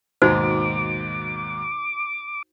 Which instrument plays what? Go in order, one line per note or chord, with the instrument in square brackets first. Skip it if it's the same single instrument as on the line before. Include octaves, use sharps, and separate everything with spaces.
[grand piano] D#2 G#2 B2 [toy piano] D#4 F#4 C5 [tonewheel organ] D6